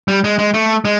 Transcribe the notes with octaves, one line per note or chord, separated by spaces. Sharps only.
G3
G#3
G#3
A3
G#3